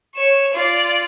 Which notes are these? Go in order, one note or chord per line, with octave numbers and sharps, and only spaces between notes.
C#5 E7
F4 D5